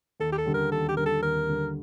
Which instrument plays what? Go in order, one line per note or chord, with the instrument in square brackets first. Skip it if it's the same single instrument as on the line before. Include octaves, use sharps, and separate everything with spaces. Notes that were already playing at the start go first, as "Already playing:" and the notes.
[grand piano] D#2 [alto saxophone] A4
[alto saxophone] G4
A4
[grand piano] D3 G3
[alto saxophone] A#4
[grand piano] D#2 [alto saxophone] A4
[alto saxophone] G4
[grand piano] D3 G3 [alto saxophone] A#4
[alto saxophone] A4
[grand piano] D#2 [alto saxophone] A#4
[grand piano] D3 G3